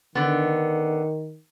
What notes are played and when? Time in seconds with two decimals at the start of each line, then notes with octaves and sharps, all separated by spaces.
0.15 D3 D#3 B3